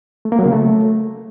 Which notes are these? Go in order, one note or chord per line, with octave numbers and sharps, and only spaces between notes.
A3
A#3
F#3
C#3
A3